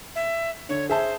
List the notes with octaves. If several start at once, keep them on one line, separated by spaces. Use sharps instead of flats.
E5
D3 C#5
G#4 C5 E5 A5